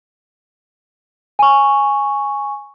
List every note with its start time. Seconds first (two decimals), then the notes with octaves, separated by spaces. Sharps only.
1.39 G#5 C#6